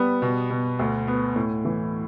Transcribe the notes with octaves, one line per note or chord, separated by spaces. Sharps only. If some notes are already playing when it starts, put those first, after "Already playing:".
Already playing: G3 B3
B2
B2
D2
B3
A2
E3